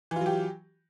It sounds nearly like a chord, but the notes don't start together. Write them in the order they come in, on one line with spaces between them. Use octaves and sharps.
E3 F4 F#3 G4